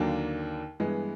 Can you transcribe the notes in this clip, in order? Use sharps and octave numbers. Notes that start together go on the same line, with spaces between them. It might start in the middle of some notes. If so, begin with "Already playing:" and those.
Already playing: D#2 D3 F#3 A#3 D4
G2 E3 G#3 B3